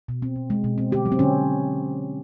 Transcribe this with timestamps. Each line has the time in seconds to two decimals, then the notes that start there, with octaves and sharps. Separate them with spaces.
0.08 B2
0.22 C4
0.36 B2
0.50 G#3
0.64 B2
0.78 C4
0.91 D3 G4
1.05 F#3
1.12 C4
1.19 D3 C#4